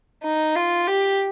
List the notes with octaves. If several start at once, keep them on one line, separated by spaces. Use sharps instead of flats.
D#4
F4
G4